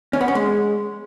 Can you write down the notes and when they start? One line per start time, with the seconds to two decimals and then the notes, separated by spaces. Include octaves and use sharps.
0.13 C#4
0.21 B3
0.28 C#4
0.35 G#3